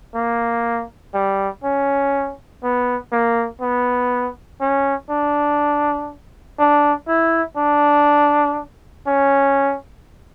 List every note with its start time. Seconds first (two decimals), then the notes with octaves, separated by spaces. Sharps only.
0.15 A#3
1.14 G3
1.64 C#4
2.63 B3
3.12 A#3
3.61 B3
4.61 C#4
5.10 D4
6.59 D4
7.08 E4
7.57 D4
9.07 C#4